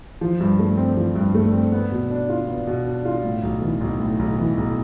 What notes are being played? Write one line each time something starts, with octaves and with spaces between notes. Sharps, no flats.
F3
G2
A3
C4
F3
G2
A3
C4
B3
B2
D4
F4
B3
B2
D4
F4
A2
B1
E3
B1
A2
B1
E3
B1